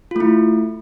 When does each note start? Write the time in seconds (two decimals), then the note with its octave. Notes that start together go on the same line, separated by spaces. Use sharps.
0.11 F4
0.16 A3
0.20 E4